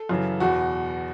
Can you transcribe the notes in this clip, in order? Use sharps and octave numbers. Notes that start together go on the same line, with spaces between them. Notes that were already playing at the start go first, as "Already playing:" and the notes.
Already playing: A4
F#2 C#3 E3
E2 B2 F#4